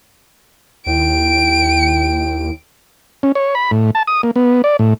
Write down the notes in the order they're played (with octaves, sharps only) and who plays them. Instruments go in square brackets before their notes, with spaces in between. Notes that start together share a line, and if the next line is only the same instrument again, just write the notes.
[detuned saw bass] D#2 [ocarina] E4 [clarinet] G5 [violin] D7
[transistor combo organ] C#4
C#5
B5
A2
A5
D#6
A#3
B3
D5
A2